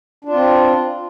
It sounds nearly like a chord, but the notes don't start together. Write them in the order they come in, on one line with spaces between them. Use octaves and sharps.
D4 F4 C4